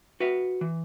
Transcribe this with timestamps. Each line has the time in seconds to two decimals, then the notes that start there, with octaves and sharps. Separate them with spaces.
0.20 F#4 B4 E5
0.61 E3